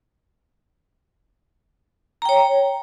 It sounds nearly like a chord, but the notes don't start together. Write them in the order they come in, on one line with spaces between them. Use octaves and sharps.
A#5 G5 C#5